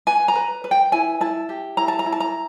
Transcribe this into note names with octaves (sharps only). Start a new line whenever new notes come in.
B4 G#5
A#5
B4
B4
G5
E4 G#5
E4 A5
G4
E4 A#5
A5
A#5
E4
A5
A#5